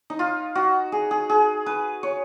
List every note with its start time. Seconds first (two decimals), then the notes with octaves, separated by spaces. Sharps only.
0.10 D#4
0.19 F4
0.55 F#4
0.92 G#4
1.11 G#4
1.30 G#4
1.66 B4
2.03 C#5